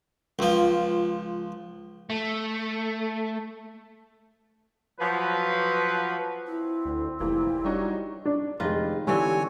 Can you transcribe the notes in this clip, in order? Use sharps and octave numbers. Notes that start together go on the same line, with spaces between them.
C#2 F3
A3
F3 F#3 B4
C4 E4
D2
F1 E3 G3 A#3 E4
G3 D4 D#4 F#4 C#5
D4
F1 D#3 G#3 F4 B4
D3 E3 G3 C4 C#5 G#5